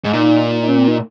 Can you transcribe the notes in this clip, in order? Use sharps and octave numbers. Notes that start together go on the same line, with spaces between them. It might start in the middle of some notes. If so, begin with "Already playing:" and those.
G#2
A#2 D#4
D#4
C#4
C4
D#4